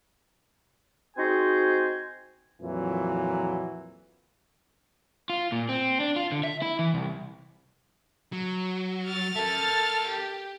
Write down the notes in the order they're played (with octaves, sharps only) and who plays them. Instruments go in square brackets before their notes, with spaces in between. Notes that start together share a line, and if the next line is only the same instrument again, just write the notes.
[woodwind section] C4 D#4 F#4 G#4 C5 G#5
[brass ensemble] F2 A#2 E3 F#3
[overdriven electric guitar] F4
A#2
C4
D4
F4
D3
E5
E4
E3
C2
[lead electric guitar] F#3
[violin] F6 A6
[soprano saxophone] A4 [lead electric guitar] A#4 E5
[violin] G4